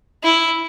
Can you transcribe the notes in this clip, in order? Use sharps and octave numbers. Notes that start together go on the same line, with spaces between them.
E4